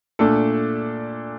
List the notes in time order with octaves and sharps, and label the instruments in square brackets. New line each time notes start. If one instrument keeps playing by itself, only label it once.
[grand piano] A#2 A3 D4 A4